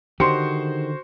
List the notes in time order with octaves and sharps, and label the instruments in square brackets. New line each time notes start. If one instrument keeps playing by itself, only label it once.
[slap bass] D3 [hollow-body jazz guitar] D#3 G4 [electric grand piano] F#4 C5 [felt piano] C6 C#7